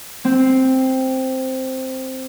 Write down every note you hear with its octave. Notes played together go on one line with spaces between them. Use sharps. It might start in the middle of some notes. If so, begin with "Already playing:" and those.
C4